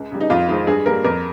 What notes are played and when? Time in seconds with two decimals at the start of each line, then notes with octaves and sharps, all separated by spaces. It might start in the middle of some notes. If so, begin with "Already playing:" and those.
Already playing: C#2
0.11 C#3 G3
0.20 D#4
0.30 F2 F4
0.48 D#3 G#3 C4 F4
0.67 G2 G#4
0.86 G3 A#3 A#4
1.04 F2 A#4